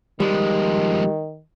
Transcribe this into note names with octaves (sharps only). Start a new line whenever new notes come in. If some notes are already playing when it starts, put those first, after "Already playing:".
D#3 F3 G3 G#3